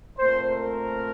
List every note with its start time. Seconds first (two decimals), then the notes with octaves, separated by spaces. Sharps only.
0.18 A#2 A3 C4 C5
0.48 A#4